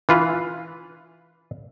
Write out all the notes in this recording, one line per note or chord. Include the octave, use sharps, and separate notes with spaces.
E3 F4 B4